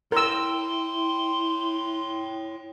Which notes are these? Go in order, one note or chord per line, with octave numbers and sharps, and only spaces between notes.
E4 A#4 C#5 G5 C6 E6